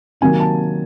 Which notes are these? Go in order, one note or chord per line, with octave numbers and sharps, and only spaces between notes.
C3 D#3 F#3 A#3 G#5
A5